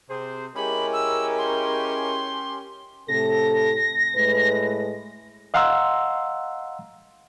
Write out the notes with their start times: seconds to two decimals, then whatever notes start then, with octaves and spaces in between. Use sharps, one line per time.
0.10 C3 G#4 C5
0.56 G#3 C#4 E4 G4 A#4 B5
0.93 E6
1.38 C6
3.08 A2 C3 A4 A#6
4.15 A2 G#3 B4
5.54 D#5 F5 F#5 A#5 C6 E6